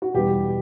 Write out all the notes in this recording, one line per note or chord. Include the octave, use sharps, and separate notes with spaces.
F#4
E2 B2 G3 G4